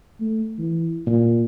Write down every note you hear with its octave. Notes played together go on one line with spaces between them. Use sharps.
A3
E3
A#2